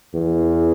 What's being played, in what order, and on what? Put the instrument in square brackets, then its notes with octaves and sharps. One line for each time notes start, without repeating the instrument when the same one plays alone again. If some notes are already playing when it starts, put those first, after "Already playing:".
[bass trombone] E2